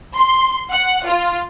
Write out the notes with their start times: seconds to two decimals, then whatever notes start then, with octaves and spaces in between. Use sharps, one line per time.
0.15 C6
0.72 F#5
1.07 F4